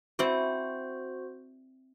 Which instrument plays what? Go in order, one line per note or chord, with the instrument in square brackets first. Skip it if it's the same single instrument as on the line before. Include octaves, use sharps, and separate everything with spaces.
[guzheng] C4 E4 D5 [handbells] F#4 C5